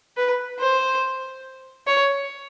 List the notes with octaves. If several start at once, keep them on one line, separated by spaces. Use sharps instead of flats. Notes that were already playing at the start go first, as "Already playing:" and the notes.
B4
C5
C#5